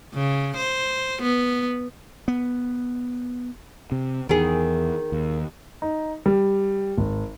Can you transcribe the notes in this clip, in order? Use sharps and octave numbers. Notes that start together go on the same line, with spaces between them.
C#3
C5
B3
B3
C3
E2 D#3 G#4
D#2
D#4
G3
G#1